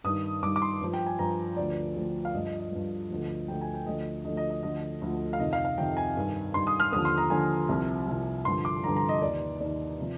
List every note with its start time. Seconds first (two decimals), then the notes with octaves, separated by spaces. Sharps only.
0.04 G2 D#3 D#6
0.43 G2 D#3 D6
0.56 D6
0.62 C6
0.81 G2 F3
0.94 G5
1.06 G#5
1.19 G2 F3 A#5
1.57 D2 D3 F3 D5
1.95 D2 D3 F3
2.25 F5
2.34 G2 F3 D#5
2.46 D#5
2.60 D#5
2.71 G2 F3
3.10 D2 D3 F3
3.48 D2 D3 F3 G5
3.61 G#5
3.74 G5
3.86 D2 D3 F3 D#5
4.24 D2 D3 F3 D#5
4.37 D#5
4.50 D#5
4.63 D2 D3 F3 D#5
5.02 D2 D3 F3
5.33 F5
5.39 F2 C3 D#3 D#5
5.53 F5
5.65 F5
5.78 F2 C3 D#3 G5
5.97 G#5
6.16 G2 D#3
6.54 G2 D#3 C6
6.67 D#6
6.80 F6
6.92 D#2 D3 F3 D#6
7.05 C6
7.18 A#5
7.30 D#2 D3 F3 G#5
7.69 C2 C3 F3
8.07 C2 C3 F3
8.45 G2 D3 F3 C6
8.65 D6
8.83 G2 D3 F3 A#5
8.96 A#5
9.09 D#5
9.22 D#2 D#3 D5
9.60 D#2 D#3 D5
10.00 C3 F3